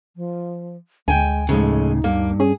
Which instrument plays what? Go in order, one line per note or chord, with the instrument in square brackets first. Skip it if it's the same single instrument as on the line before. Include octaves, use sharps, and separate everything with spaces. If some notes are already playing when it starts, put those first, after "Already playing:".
[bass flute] F3
[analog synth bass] D2 [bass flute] G#3 [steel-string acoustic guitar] G5 G#5
[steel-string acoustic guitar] F2 G#3 [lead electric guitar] A2 C#3 [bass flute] D#4
[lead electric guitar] G2 [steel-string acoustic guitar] A#3
[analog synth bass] C#4 [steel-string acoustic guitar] G#4